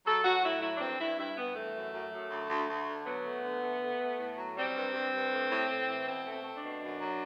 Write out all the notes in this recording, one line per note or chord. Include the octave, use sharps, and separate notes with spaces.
F#3 A4
F#3 F#4
A2 E4
F#3 E4
D4
G2 C4
G2 E4
G2 E4
G2 B3
E3 A3
F#2
F#2
F#2
D2
D2
D2
D3
F#3 B3
A3
D3
A3
A3
A3
A2
F#3
G3 C4
G2
G2
G2
A2
A2
A2
E3
B2 C4
A3
C4
A3
D4
B2
F#2
F#3